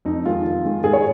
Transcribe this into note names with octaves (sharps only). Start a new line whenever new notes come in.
F2 D#4
D#3 G#3 F4
F2
D#3 G#3
G#2 G#4
C#5